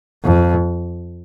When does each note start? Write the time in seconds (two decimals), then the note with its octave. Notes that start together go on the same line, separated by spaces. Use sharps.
0.23 F2